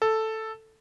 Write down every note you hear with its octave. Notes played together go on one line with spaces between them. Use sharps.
A4